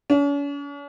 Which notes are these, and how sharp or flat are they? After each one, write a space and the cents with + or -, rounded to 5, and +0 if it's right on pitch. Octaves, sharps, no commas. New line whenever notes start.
C#4 +45